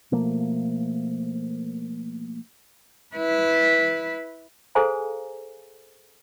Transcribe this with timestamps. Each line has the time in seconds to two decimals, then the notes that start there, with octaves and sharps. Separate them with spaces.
0.12 B2 F3 A3 A#3
3.16 E4 B4
4.75 G#4 A4 C5 F5 G#5 A#5